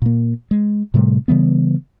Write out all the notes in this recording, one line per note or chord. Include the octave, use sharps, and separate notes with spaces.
A#2 A#3
G#3
A2 C3 G3 A3
C#3 E3 G3 B3